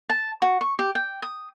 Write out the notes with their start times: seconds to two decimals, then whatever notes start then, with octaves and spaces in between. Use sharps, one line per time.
0.09 A5
0.42 F#4
0.61 C#6
0.79 G4
0.95 G5
1.22 D#6